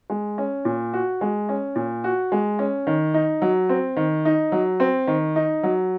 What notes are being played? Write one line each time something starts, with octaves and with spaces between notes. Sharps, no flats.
G#3
C#4
A#2
F#4
G#3
C#4
A#2
F#4
G#3
C#4
D#3
D#4
F#3
C4
D#3
D#4
F#3
C4
D#3
D#4
F#3